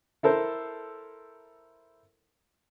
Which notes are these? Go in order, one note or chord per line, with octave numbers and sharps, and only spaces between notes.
E4 A4 A#4 C5